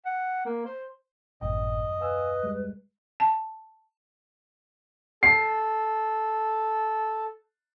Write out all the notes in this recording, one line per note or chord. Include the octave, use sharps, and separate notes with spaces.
F#5
A#3
C5
D#1 G#1 F#2 A2 D#5 G5
B4 F5 G#5 E6
G3 G#3
A5
A4 C7